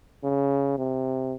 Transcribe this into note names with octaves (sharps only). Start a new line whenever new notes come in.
C#3
C3